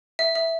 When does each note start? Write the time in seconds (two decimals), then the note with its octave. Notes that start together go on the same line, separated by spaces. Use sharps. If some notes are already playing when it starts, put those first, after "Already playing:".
0.19 E5
0.35 E5